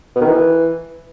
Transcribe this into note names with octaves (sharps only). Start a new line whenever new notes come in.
B2
D#3
E3